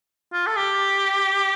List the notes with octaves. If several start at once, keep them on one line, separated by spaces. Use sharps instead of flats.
F4
A4
G4